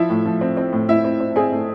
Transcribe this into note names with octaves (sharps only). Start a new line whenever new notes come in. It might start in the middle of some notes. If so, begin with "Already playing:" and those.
Already playing: F3 E4 E5
A2
F3
C4
C4
A2
A2 E4 E5
C4
C4
C4 G#4 G#5
A3